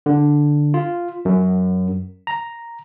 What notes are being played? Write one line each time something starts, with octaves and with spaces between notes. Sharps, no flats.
D3
F4
F#2
A#5